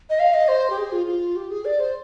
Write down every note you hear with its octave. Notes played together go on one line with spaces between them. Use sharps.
D#5
F5
D#5
C5
G4
G#4
F4
F4
G4
G#4
D5
C5